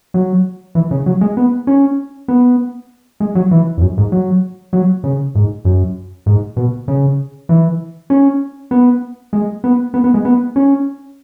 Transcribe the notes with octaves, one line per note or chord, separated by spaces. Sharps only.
F#3
E3
C#3
F#3
G#3
B3
C#4
B3
G#3
F#3
E3
E2
F#2
G#2
F#3
F#3
C#3
G#2
F#2
G#2
B2
C#3
E3
C#4
B3
G#3
B3
B3
B3
G#3
B3
C#4